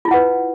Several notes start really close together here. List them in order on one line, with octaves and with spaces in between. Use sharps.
F4 E4 F#5 B4